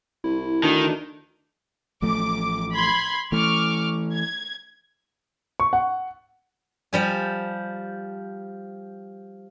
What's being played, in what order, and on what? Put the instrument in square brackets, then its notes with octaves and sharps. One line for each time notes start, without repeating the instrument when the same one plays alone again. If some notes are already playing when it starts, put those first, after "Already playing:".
[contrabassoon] C2 [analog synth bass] E4
[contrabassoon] D2 [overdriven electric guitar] D#3 [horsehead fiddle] D4
[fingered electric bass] A1 F3 A3 [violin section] D6
[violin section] B5 C6 G#6
[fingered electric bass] E3 A3 [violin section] C#6 D6 F6
[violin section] G#6
[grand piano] C#6
F#5
[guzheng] F3 G3 G#5